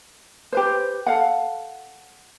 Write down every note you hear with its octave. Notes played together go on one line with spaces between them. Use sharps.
G4 B4 C5
A4 F5 F#5